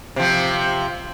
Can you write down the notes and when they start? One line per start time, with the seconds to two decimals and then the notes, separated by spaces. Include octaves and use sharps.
0.16 C3 F3